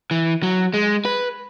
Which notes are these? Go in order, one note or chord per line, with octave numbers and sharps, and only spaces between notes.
E3
F#3
G#3
B4